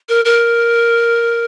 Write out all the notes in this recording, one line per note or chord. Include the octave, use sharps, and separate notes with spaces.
A#4
A#4